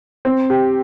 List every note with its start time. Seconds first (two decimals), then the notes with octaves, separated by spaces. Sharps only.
0.25 C4
0.50 G4